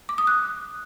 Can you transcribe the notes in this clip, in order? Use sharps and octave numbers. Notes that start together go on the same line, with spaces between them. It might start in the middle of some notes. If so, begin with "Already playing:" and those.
D6
D#6
F#6